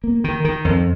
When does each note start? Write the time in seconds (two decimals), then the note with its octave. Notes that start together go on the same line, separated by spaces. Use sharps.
0.04 A#3
0.24 D#3
0.45 D#3
0.65 F2